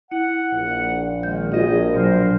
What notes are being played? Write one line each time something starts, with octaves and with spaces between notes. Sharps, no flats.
E4 F#5
A#1
D#3 G#3 G6
A#1 D4 F4 F#4 G#4 D#5
B2 F3 F#3 A#4 C5